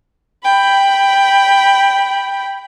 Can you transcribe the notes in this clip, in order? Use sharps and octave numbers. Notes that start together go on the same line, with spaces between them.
G5 B5